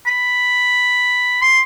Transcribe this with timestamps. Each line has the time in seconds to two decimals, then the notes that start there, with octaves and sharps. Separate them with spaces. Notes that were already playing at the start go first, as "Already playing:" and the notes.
0.07 B5
1.42 C6